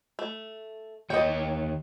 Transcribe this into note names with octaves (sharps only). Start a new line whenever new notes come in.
A3
D#2 C#5 D#5 G5